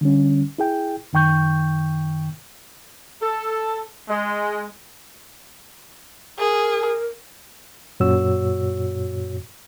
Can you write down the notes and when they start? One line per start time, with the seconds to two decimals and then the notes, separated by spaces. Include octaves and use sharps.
0.01 D3 G3 C#4
0.58 E4 G#4 G5
1.13 F#2 D#3 G5 C#6 G6
3.22 A4
4.09 G#3
6.39 G#4 A#4
8.00 F#2 A#2 F#4 C#5 E6